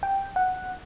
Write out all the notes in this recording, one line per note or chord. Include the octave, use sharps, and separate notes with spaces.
G5
F#5